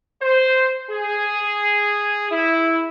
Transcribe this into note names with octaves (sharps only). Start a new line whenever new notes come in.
C5
G#4
E4